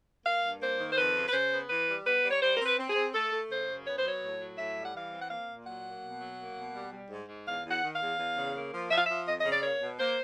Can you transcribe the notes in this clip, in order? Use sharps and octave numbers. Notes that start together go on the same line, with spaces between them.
A#3 F5
G2
A#3 C5
D#3
C5
F2 B4
C#3
B4
C#3 C5
B3
E3 B4
G3
B3 B4
G3
C#5
G3 C5
C4 A#4
B4
C4
G#4
C4
A3 A4
A3
C#3 C5
F#2
B3 C#5
C5
F#3 C#5
A2
F#3
A2 E5
G3
F#5
E3 F5
C4
F#5
A#3 F5
A#2
F#3 F#5
A#3
B2
F#3
A#3
B2
G3
G3
G#2
G#2
E2 F5
E2
F#5
D#3
F5
E2
E2
C#3
A#3
F3
F3 E5
F5
F3 E5
F2 D#5
D#5
C#3
D5
A#3 C#5
B2
A#3 C5